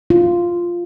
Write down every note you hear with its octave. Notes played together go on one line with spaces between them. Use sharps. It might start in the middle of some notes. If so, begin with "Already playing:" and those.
F4